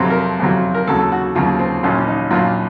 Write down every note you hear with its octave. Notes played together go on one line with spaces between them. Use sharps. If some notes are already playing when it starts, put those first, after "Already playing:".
Already playing: F2 C3 F#3
A#4
F2 C3 F#3
A#4
D#2 C#3 F#3 A4
A4
F#4
D#2 C#3 F#3 F4
C4
A#1 A#2 F#3 C#4
C#4
D#4
A#1 A#2 F#3 F4